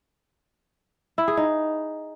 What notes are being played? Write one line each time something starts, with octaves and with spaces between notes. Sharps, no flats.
E4
G#4
D#4